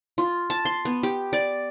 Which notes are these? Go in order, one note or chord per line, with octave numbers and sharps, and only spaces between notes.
F4
A5
C6
B3
G4
D5